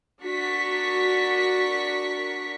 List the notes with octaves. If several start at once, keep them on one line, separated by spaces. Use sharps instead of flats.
D4 F#4 A#4 C#6 B6